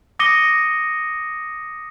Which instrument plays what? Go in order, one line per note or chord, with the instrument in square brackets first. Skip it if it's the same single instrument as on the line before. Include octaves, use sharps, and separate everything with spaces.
[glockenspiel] D6 D#6 A#6 C#7 D#7 G7